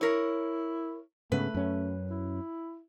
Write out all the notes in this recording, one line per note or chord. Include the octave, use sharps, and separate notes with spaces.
E4 A#4 C#5
G#2 C#3 A3 B3 B4
F#2 C#4
E4